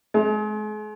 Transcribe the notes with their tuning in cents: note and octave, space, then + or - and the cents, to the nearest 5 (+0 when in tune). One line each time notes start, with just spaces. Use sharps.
G#3 +40